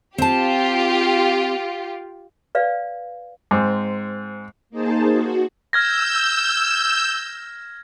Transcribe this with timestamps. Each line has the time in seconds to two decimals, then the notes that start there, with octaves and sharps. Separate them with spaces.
0.18 C4 F4 G4 A5
2.55 B4 D5 F5
3.51 G#2 C4
4.70 A#3 D#4 G#4 C5 A5
5.10 F#4
5.73 E6 F6 G6 G#6 A#6